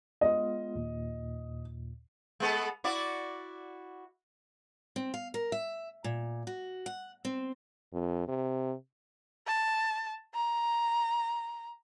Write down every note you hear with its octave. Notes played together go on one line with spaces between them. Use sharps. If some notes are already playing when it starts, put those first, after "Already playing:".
G#3 B3 F4 D#5
D#2 A#2
G#3 B3 A4
E4 F#4 D5
C4
F5
A#4
E5
A#2
F#4
F#5
C4
F2
C3
A5
A#5